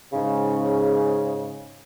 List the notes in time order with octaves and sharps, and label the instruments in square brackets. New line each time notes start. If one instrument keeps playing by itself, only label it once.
[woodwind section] G#2 C#3